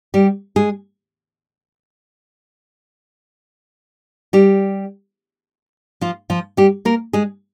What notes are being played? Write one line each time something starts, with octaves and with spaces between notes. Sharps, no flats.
G3 G4
G#3 G#4
G3 G4
F3 F4
F3 F4
G3 G4
A#3 A#4
G#3 G#4